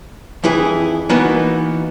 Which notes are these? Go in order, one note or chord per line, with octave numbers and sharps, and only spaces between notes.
F2 E3 E4 G#4
E3 A#3 B3 D#4 F#4 B4